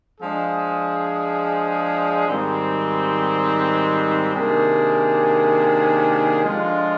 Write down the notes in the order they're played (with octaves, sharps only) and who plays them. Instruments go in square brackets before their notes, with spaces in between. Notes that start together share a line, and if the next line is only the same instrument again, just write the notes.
[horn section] F3 G#3 D4 G#4
G#2 D#3 G3 C4
C3 D#3 A#3 D4 G#4
D3 F3 G#3 D4 F4